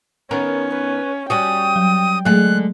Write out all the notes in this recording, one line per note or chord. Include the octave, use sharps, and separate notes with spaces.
D#3 B3 C#4 A#4
B4
G3 C#4 F#4 G5 D#6
F#3
D3 F#3 G#3 A3 F#6